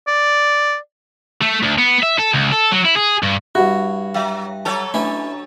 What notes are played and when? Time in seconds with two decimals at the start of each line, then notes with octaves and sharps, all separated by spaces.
0.07 D5
1.42 A3
1.63 D2
1.79 B3
2.03 E5
2.19 A4
2.34 C#2
2.52 A4
2.71 F#3
2.85 E4
2.96 G#4
3.23 G2
3.55 G2 E4 F#4
4.14 F#3 E5 F5 G5
4.65 F#3 A4 C#5 A5
4.94 A3 C#4 D4 E4 B4